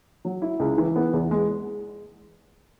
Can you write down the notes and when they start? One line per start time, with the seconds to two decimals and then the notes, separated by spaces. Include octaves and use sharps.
0.25 F#3
0.42 E4
0.60 C#2
0.78 E3
0.96 B3
1.13 E2
1.31 G#3